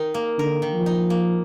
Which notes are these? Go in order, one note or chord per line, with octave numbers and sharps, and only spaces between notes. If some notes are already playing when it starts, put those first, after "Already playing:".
Already playing: D#3 D#4 A#4
A#3
D3 A#4
D#3
F3
D#4
A#3